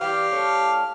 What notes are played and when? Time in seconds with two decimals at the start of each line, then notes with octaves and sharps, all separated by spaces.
0.01 E3 G3 G4 F5
0.32 A2 D4 C#5